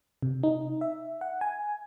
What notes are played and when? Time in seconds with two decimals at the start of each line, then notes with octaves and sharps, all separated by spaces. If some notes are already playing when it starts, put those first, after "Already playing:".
0.22 C3
0.43 D#4
0.81 E5
1.21 F#5
1.41 G#5